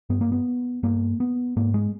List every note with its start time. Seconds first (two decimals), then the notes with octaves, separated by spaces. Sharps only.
0.10 G2 B3
0.21 A#3
0.32 B3
0.83 G2 A#3
1.20 B3
1.56 G#2 A#3
1.74 G#3